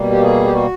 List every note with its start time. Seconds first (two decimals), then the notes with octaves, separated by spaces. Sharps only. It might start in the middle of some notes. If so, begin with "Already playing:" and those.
Already playing: B2 G3 A#3
0.11 G4
0.22 G#4
0.45 G4
0.53 F#4